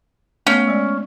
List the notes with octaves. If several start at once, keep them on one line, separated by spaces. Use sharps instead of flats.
A3 B3 C#4
G#3 D5